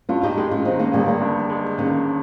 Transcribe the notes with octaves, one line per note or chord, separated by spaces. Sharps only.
G2 C#4 F4
D#4 G4
G#3 D#4 G4
C#4 F4
D#3 C4 D#4
A#3 C#4
G1 G3 A#3
G3 A#3
G2
G#3
D#3 A#3 C#4